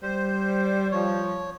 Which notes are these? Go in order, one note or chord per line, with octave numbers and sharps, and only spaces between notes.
G3 C5
F3 C#5